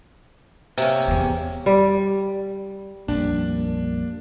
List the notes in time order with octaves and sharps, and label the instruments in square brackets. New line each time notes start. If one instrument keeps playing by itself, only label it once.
[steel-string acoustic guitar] C3 A#3 C#4
[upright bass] E2 B3
[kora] G3
[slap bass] A#1 F2 G3 [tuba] A#3 [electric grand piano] D4